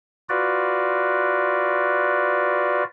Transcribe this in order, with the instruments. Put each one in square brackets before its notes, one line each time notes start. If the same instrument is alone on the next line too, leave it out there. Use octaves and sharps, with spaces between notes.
[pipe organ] F4 F#4 B4 D5